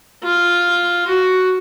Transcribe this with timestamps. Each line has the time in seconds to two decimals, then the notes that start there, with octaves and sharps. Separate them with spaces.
0.23 F4
1.07 F#4